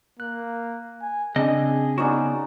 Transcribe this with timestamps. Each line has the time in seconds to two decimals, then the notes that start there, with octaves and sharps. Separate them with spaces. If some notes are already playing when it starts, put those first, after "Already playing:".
0.20 A#3 F#6
1.02 G#5
1.36 C#3 C4 D4 G#4 D#5
1.98 B3 C#4 D#4 F#4 D5